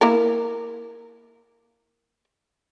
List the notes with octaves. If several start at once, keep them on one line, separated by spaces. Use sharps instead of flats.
A#3 E4 A#4